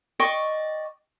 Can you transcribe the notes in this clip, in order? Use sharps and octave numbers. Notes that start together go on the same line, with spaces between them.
D5 D#5 G5 C#6